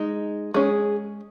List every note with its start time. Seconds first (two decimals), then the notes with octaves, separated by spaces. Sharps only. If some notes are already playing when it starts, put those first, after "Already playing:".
Already playing: G#3 D#4
0.54 G#3 C#4 G#4